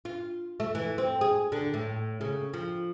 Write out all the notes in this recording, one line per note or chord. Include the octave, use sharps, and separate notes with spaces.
F4
A3
E3
C4
G#4
D3
A2
C#3
F3